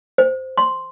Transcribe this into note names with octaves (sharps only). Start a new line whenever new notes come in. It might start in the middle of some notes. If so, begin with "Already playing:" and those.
C5
C6